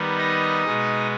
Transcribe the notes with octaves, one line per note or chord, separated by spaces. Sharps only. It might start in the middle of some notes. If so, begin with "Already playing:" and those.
Already playing: D#3 G3 B3
D#4 D#5
B2 G#3 B3